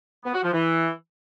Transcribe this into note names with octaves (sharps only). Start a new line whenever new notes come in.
B3
F#4
F3
E3